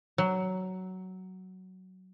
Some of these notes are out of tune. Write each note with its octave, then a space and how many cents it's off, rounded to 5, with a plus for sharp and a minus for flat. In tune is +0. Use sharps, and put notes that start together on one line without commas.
F#3 +10